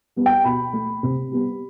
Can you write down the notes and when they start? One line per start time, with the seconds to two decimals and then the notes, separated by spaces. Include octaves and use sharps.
0.16 G3 B3
0.26 G5
0.44 B2 B5
0.73 A3
1.03 C3
1.32 G3 B3